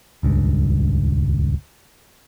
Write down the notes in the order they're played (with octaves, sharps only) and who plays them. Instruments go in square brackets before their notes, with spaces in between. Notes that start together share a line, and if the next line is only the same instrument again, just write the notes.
[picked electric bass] D#1 C#2 G2